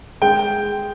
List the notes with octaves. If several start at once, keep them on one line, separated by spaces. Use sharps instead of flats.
G#3 G5